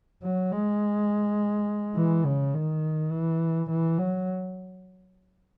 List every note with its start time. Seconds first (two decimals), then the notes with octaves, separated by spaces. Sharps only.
0.23 F#3
0.52 G#3
1.96 E3
2.25 C#3
2.54 D#3
3.12 E3
3.70 E3
3.98 F#3